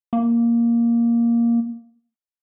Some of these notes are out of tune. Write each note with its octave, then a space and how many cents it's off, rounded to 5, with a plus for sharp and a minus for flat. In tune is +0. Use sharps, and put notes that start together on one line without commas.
A#3 +5